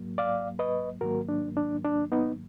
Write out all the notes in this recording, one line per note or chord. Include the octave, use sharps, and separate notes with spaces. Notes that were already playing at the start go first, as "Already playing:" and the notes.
Already playing: G#2 F#3 A#3
D5 F5
B4 D#5
G#2 D#3 F#3 A#3 F#4 A#4
D4
D4
D4
B3 D#4